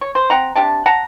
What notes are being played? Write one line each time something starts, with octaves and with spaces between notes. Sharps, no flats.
C#5
C5
C4 F#5 A#5
C3 D4 G4 A5
F#5 A5 A#5